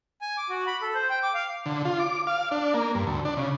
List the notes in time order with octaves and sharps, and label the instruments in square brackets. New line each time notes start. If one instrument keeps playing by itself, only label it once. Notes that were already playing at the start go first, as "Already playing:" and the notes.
[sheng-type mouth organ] G#5
D6
F#4
B5
A4
C5
G5
D6
F5
[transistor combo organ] D3
F4
D6
F5
D4
A#3
G2
D2
D4
C#3